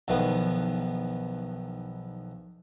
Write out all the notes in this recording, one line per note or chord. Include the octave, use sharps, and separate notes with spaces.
B1 E2 D#3 F3 B3